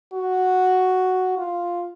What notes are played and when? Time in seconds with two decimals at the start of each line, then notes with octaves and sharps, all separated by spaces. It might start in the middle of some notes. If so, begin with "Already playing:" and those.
0.13 F#4
1.38 F4